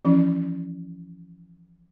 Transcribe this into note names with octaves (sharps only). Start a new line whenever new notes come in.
E3 F3 C#4 E4